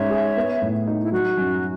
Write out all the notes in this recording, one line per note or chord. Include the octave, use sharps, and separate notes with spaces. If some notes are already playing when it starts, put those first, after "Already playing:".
Already playing: G#2 C#4 C#5 E5
G#4
B3
A2
D#4
E4
F#3 F#4
F#2